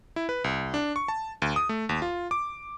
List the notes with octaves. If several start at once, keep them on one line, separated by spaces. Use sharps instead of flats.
E4
B4
C2
D4
C#6
A5
D2
D#6
A3
D#2
F4
D6